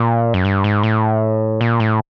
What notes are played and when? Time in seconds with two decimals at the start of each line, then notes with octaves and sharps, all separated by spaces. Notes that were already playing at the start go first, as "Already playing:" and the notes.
Already playing: A#2
0.34 F#2
0.45 G2
0.64 G#2
0.83 A2
1.61 A#2
1.80 A2